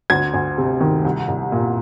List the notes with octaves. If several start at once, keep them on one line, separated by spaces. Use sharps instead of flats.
D2 G#6
D2
C3
D#3
C2
C2
A#2